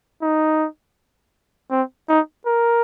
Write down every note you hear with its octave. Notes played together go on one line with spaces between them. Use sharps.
D#4
C4
D#4
A#4